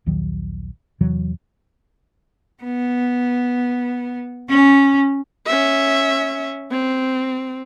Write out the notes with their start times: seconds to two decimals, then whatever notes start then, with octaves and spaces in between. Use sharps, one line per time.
0.06 A#1 D#2 D#3 F#3
1.01 E2 C3 E3 F#3
2.63 B3
4.49 C#4
5.46 C#4 E5
6.71 C4